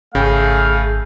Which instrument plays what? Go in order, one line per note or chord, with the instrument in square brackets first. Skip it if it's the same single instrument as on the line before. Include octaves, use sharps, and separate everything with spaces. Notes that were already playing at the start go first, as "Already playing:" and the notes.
[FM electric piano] G#1 G6 [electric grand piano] C#3 [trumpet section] A3 F5 [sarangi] G#4